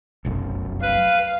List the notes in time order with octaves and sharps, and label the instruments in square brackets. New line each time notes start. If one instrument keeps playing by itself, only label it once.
[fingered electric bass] F1 B1 F#2
[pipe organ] B4 [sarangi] F5